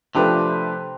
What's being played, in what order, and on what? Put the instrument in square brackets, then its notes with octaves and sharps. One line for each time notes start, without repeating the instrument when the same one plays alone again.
[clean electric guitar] C3 [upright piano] F3 A3 D4 G4 B4